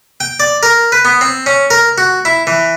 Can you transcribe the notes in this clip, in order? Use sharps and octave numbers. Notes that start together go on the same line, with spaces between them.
G5
D5
A#4
B4
B3
C4
C#4
A#4
F#4
E4
E3